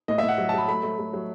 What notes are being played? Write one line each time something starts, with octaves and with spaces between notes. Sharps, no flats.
A2 D#5
E5
A2
F#5
F#3
A5
F#3 B5
A3 B5
A3
A3
F#3